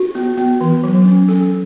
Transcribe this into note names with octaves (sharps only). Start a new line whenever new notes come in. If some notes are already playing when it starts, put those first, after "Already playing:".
Already playing: F#4
B3
B3
E3
F#3
C#4
C#4 A4